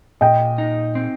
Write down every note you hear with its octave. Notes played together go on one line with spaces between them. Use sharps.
A#2 D#5 G5
D#4
C4